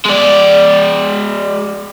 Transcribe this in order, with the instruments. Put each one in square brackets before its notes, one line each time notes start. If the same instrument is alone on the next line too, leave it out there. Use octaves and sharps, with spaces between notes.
[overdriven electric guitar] G#3 D5